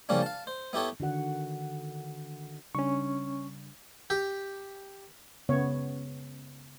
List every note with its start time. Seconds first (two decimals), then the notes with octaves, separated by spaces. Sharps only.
0.09 C#3 F3 G3 A#3 C#4 D4
0.22 F5 A5
0.47 C5
0.73 B3 E4 G4 A4 C#5
1.00 D3 D#3 F#4 F#5
2.75 C#3 G3 C#4 D4 C#6
4.10 G4
5.49 C#3 B3 C#5